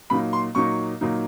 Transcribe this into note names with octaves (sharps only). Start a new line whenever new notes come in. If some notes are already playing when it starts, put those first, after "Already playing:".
A#2 F#3 A#3 D#4 B5
C6
A#2 F#3 A#3 D#4 C#6
A#2 F#3 A#3 D#4